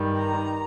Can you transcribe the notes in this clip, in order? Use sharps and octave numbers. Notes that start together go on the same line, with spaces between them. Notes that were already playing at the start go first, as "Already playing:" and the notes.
Already playing: G2 D#3 G3
A#5